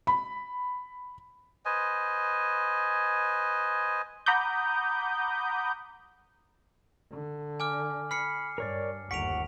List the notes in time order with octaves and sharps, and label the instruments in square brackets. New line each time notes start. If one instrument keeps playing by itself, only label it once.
[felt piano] B5
[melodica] B4 C5 D#5 G#5
[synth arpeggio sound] F#5 A#5 B5 D6 D#6 G6
[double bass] D3
[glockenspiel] G#5 D6 F6
[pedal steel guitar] B5 [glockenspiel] F6 C7 C#7
[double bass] G2 [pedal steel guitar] A#4 C#5 D5
[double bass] G1 D#2 [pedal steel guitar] F#5 C#6 [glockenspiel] B6 D7 F7